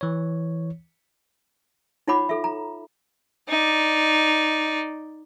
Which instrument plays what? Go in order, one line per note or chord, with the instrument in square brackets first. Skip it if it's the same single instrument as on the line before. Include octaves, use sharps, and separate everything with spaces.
[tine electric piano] E3 C#5
[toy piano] D#4 F4 C#5 F#5 B5 D6
A4 E5
A#5
[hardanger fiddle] D#4 D5